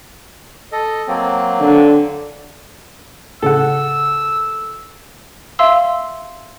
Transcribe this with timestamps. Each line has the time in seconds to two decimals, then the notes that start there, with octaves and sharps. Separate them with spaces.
0.72 A4 D#5
1.08 F#3 A#3 C4
1.60 D3
3.42 A2 C#3 A4 F#5 E6
5.59 E5 F5 C6 E6